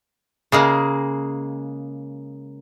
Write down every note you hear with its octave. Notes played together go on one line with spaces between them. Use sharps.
C#3 G#3 A#3